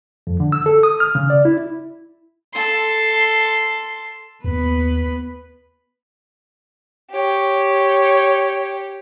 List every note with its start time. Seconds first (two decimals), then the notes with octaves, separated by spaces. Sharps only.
0.27 F2
0.40 D3
0.52 E6
0.66 A4
0.83 D#6
1.00 F6
1.15 C#3
1.30 D5
1.45 E4
2.53 A4 C6
4.44 D#2 B3 B4
7.11 G4 C#5